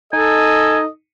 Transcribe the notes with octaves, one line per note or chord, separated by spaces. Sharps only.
D#4 A4 D#5 G#5